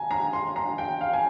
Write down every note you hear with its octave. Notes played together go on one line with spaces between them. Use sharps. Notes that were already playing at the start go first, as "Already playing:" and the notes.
Already playing: G#5 A#5
A#5
C6
A#5
G5
F5
G#5